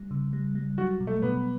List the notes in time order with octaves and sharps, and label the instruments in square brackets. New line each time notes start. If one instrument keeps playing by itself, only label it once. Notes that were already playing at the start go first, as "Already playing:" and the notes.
Already playing: [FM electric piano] G3
C#3
G3
G3
[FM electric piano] F#3 [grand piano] F#4
[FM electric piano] B2
[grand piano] A3
[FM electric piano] B2 [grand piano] B3